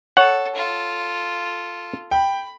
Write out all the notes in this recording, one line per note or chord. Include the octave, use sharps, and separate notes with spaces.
A4 C#5 F#5
F4 A4
G5 B5